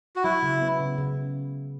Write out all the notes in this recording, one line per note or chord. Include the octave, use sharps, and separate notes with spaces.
F#4
F#3 E4
C#3
B3
C#3
C#3